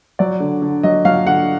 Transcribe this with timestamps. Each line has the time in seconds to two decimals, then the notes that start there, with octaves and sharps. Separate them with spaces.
0.19 F#3 D5
0.40 D3
0.62 D3
0.83 F#3 D#5
1.05 F#3 F5
1.26 D3 F#5